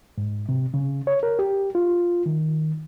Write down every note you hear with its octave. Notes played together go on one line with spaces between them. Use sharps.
G#2
C3
C#3
C#5
A#4
G4
F4
D#3